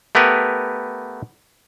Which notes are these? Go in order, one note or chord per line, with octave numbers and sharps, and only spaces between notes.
A3 B3 G4 A#4 B4